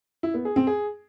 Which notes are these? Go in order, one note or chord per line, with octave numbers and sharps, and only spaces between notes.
E4
B3
G#4
C4
G#4